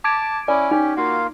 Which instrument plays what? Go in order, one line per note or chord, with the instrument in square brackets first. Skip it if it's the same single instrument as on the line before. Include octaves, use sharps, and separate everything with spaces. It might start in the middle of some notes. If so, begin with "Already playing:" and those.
[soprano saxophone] A5 [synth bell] D6 G#6 D7
[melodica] C#4 E4 [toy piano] D5 [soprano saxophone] G#5
[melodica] C#4 G4 [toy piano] D#4
[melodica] A#3 F4 F5 [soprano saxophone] F#4